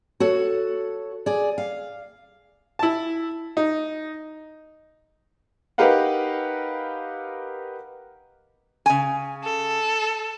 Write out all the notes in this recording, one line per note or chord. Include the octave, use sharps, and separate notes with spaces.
F#4 A4 C#5
G#4 D5
F5
E4 A5
D#4
D#4 G4 A#4 B4 F5 F#5
C#3 G#5
A4